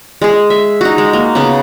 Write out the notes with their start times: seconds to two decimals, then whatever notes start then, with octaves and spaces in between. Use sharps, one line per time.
0.22 G#3 G#4
0.50 E5
0.81 D#4 F#4
0.98 G#3
1.13 A#3
1.35 C#3 B3